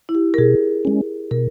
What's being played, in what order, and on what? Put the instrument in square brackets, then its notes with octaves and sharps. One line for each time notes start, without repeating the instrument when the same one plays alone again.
[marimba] E4
G4
A#4
[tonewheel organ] B2 [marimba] G#4
[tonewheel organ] G#3 C#4
[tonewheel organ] B2 [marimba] A#4